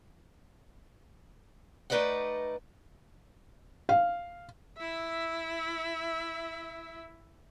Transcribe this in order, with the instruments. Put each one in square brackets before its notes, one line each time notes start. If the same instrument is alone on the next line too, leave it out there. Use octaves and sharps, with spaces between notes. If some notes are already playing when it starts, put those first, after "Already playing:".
[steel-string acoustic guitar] A3 D#4 B4 D5 D#5 F#5
[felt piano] F5
[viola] E4 E5